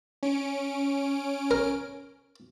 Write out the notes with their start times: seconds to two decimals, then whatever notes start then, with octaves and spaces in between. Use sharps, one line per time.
0.23 C#4 D7
1.51 A#4